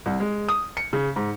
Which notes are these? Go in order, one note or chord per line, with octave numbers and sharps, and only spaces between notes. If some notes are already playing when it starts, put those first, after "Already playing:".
C2
G#3
D#6
C#7
C#3
G#2